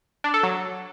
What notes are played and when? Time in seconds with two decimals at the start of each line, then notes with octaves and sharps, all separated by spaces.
0.24 D4
0.34 A4
0.43 F#3